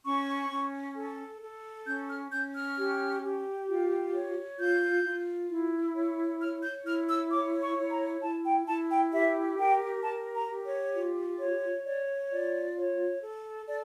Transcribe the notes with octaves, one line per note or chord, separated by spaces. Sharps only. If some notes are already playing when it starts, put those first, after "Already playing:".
C#4 C#6
C#4
A4
A4
C#4 G6
F6
C#4 G6
F6
G4
G4
F4
C#5
F4 G6
F4
E4
C#5
C#5 F6
G6
E4 F6
E6
C#5 D6
C#6
E4
A#5
E4 A5
G5
E4 A5
G5
G4 E5
A#4 G5
G4 A5
A#5
G4
C#5
F4
C#5
C#5 D5
F4 D5
C#5
A4
A4 D5